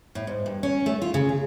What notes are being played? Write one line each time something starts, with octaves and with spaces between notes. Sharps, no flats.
A2
G#2
G2
C#4
A3
F4
C#3
G#4